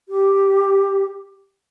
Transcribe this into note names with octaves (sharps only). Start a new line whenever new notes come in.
G4